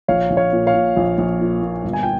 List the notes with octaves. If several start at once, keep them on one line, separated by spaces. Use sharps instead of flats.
A#1 C#5 F5
A#1
C#5 F5
A#2
C#5 F5
A#2
A#1
A#1
A#2
A#2
G1
G#5
G5